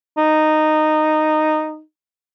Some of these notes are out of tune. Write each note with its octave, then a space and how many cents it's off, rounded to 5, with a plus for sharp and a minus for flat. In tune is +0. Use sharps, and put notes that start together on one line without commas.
D#4 -10